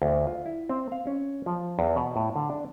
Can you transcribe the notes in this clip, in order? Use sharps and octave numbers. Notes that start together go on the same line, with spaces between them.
D2
F4
E4
C4
F5
C#4
F3
E2
B2
A2
D3
D4